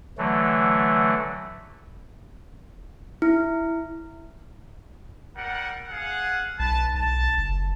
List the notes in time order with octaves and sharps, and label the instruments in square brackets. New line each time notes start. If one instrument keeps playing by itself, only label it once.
[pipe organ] D3 E3 F#3 A3
[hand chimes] E4
[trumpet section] G3 A#4 F#5
G#4 F5 F#5
[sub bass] B1 [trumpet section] B4 A5
[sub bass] B1 [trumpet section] A5
[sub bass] F#1